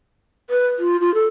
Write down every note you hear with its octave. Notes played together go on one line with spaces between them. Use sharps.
B4
F4
F4
A4